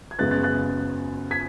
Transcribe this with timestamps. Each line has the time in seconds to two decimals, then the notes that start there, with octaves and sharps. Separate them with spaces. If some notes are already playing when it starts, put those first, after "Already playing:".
0.11 G#6
0.19 F#2 C#3 G#3 B3 F#6 A6
0.31 F#6 A6
0.43 F#6 A6
1.31 G#6 B6